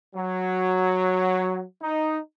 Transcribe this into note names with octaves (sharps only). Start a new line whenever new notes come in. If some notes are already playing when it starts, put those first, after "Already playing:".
F#3
D#4